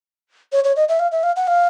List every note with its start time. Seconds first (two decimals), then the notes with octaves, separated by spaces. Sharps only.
0.52 C#5
0.64 C#5
0.76 D#5
0.89 E5
0.99 F5
1.12 E5
1.23 F5
1.36 F#5
1.47 F5